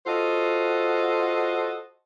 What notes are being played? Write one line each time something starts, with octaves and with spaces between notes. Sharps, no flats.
F4 F#4 A4 C5 D#5